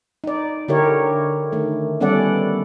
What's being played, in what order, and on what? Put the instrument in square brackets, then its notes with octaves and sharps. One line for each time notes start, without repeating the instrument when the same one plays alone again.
[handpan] D#4 D5
D3 E4 G4 A#4 C#5
D#3 A3
G3 B3 C#4 A4 D5 F#5